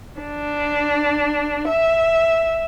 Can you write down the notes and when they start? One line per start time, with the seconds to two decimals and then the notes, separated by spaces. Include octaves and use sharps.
0.21 D4
1.67 E5